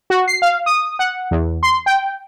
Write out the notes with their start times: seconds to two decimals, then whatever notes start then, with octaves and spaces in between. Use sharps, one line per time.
0.10 F#4
0.28 C7
0.42 F5
0.66 D#6
0.99 F#5
1.31 E2
1.63 C6
1.86 G5